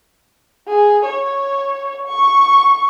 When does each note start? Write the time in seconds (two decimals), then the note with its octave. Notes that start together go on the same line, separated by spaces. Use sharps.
0.68 G#4
1.05 C#5
2.07 C#6